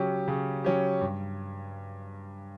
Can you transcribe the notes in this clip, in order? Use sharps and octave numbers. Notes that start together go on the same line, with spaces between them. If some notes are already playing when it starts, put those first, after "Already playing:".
Already playing: C#3 F#3 C#4 G4
C#3
F#3 C#4 G4
G2